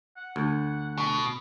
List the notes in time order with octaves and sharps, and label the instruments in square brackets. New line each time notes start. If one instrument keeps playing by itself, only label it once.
[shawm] F#5
[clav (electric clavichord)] D2
[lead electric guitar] B2